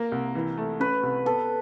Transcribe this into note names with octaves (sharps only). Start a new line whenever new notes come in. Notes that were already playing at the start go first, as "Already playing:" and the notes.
Already playing: A#3 A#4
C2
E3
A3
C#4 B4
C2
B3 A4